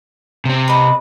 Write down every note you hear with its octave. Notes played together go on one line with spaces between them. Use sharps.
C3 C4
B4 D#5